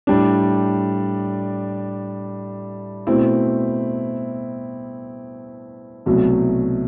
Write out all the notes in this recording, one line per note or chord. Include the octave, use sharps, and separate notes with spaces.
A2 G3 D4
B2 A3 C4 E4
C2 B2 F#3 A3